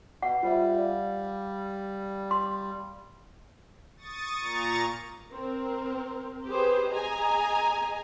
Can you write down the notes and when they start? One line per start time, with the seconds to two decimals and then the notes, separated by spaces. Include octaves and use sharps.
0.22 B2 F#5
0.43 G3 F4 C5 E5
0.75 D5 F5
2.31 C6
3.97 C#6 D#6 A6
4.39 A#2 A#5 C#6 A6
5.31 C4 A#4
6.47 G4 G#4 B4 C5
6.92 G#4 D#5 G#5 A#5